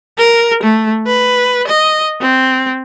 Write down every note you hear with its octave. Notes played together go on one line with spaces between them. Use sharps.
A#4
A3
B4
D#5
C4